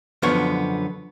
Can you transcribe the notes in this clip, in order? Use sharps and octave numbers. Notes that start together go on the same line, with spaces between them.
F#2 D3 F3 B3 C#5